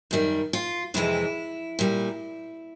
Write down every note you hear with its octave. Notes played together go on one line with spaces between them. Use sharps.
F#2 D#3 G3
F4
F2 C3 E3 G#3 E4
A#2 G3